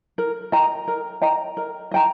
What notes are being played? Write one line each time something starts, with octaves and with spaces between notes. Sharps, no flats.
A#4
D#5 G5 A#5
A#4
D#5 G5 A#5
A#4
D#5 G5 A#5